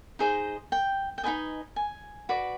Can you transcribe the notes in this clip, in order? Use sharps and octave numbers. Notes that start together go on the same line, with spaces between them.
D#4 G#4 C5 D#5
G5
G5
D#4 G4 B4 D#5 G#5
G#5
F#4 B4 D5